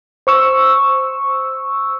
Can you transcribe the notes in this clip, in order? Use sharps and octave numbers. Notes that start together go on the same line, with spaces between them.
C5 C#6 E6